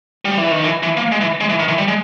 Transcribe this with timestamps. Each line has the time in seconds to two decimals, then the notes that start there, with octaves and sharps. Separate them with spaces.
0.25 G3
0.38 E3
0.51 D#3
0.64 E3
0.83 E3
0.97 A#3
1.12 G#3
1.21 E3
1.40 G#3
1.49 E3
1.59 D#3
1.68 E3
1.78 G3
1.88 G#3